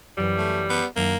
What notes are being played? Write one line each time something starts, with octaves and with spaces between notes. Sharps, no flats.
F#2 E3 G3
A3
B3
F#2 D#3 A#3 D4